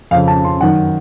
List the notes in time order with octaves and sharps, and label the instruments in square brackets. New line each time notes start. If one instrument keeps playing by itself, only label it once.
[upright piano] F2 F5
C#3
A5
C6
F#2 D#3 F#5